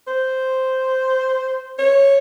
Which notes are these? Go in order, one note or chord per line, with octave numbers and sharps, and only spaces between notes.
C5
C#5